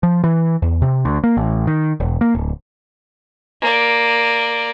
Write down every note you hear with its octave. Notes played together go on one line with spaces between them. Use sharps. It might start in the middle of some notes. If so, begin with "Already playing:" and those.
F3
E3
E2
C3
D2
A#3
A1
D#3
E1
A#3
D1
A#3 D5